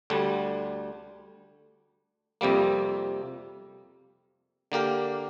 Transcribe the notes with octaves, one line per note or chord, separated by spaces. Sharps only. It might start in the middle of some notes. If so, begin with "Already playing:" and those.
D2 D3 G3
F2 C3 G3 A#3
D3 A#3 G4 A#4